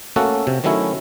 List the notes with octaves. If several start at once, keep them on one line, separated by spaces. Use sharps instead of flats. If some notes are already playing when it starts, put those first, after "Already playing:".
A3 A#3 C#4 F#4 A4
C3
D#3 F#3 A3 C#4 E4